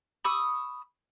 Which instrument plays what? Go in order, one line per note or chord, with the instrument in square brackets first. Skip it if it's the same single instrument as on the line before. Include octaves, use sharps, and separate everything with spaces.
[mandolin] B5 C#6 D#6 E6